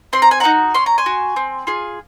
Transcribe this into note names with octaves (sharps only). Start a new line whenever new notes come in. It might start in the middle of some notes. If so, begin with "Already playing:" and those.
C4 C6
A#5
G#5
D#4 F#4 F#5 A#5
C#4 C6
A#5
G#5 C6
F#4
C4
F4 G#4